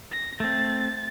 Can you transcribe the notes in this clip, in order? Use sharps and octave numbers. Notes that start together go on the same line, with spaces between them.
A#6
A3 C4 A6